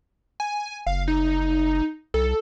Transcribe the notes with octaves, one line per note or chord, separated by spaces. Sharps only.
G#5
F#1 F5
D#4
C2 A4